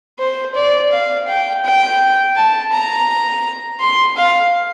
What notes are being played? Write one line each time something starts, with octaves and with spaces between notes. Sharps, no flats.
C5
D5
F5
G5
G5
A5
A#5
C6
F5